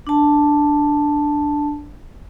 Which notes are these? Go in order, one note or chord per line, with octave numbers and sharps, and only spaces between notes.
D4 A5